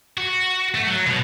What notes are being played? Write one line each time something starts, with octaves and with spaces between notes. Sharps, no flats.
F#4
A3
F#3
B2